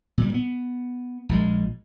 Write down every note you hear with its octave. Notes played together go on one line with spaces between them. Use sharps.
A#2 G3
B3
A#1 A#2 G#3